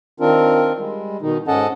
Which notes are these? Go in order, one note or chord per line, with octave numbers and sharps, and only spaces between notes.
D#3 C4 D4 F4 A#4
G3 G#3
B2 D#3 D#4
G#2 C#4 A4 D#5 F#5 A5